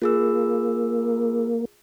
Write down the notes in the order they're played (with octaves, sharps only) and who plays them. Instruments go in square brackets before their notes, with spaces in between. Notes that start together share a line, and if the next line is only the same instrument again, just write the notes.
[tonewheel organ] A#3 [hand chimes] F4 G#4 E6